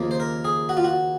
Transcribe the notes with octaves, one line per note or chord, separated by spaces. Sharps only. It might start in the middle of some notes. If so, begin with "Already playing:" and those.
Already playing: D#2 C#3 F3 A#3
C5
A#4
G#4
F#4
F4
F#4